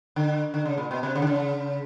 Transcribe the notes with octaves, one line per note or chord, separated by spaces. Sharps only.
D3
D3
C#3
A#2
B2
C3
C#3
D3
C#3